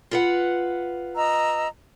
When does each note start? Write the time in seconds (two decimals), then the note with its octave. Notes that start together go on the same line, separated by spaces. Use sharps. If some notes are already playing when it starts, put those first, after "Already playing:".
0.11 F4 B4 F#5
1.15 D#5 A#5 E6